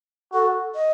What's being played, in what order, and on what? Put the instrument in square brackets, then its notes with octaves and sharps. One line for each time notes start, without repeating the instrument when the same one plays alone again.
[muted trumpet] F#4 [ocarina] A4
[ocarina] D#5